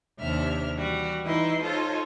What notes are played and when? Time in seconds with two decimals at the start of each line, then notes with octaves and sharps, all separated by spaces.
0.19 D#2 C3 D4 E5 F6
0.76 E3 G3 F#4
1.23 E3 D#4 E4 B4 C6
1.62 D#4 F4 A4 C5 C#5